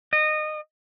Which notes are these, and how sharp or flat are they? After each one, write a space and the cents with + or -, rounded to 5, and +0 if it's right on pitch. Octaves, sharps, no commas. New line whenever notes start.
D#5 -20